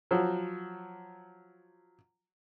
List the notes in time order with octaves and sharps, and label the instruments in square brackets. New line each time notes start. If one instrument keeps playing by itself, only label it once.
[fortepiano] F3 F#3